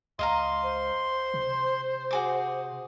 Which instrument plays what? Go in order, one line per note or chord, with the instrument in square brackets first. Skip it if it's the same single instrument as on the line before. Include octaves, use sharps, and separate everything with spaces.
[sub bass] C#2 [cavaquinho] D#5 F5 A#5 [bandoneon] C6
[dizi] C5
[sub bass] C3
[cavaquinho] F#4 G#4 D6